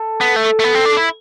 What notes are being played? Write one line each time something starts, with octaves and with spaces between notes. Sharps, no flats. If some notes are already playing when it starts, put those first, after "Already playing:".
Already playing: A4
B3
A3
A3
B3
C4
D4
E4